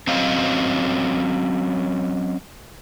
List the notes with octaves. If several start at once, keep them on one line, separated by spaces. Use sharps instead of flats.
F#3 C4 C#4 D#5 F5